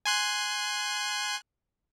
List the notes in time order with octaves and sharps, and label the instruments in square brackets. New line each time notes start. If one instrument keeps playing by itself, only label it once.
[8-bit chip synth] G#5 C6 F#6